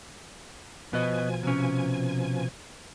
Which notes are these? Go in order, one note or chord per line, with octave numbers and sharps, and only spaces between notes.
B2 F3 B3 B4 D#5 G#5
C3 C#4